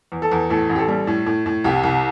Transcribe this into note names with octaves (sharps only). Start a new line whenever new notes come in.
E2
A4
E2
A2 A4
A1
G4
A4
G3
A2
A2
A2
C2 G4
C2